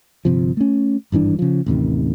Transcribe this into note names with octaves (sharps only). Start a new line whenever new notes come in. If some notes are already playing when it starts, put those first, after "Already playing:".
G1 C3 F3
A3 C#4
G#1 G2 E3 D4
C#3 F3
A1 D#2 C3 D#3